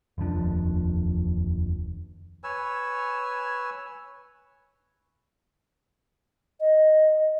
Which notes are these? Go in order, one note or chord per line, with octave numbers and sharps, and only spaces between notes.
F1 D#2 F3 D4
B4 C#5 G#5 E6
D#5